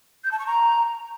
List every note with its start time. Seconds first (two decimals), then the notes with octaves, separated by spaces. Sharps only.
0.24 G6
0.31 A5
0.39 C#6
0.47 A#5